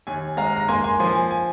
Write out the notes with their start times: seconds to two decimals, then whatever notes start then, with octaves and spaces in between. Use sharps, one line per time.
0.07 D#2 G#5
0.37 G#3 F5 A#5
0.56 A#5
0.68 A#3 G#5 C6
0.84 G#5 C6
1.00 F3 G#5 C6
1.15 G#5
1.31 G#5